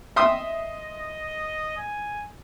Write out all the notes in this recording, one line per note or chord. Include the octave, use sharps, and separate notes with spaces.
D#5 E5 C6 D#6
G#5